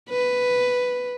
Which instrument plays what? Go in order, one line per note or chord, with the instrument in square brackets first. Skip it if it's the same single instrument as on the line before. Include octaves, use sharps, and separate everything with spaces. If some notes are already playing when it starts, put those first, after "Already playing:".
[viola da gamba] B4